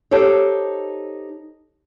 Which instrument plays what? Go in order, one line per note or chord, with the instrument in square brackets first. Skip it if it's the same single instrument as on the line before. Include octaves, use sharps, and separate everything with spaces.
[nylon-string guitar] D#4 G4 A4 C5 C#5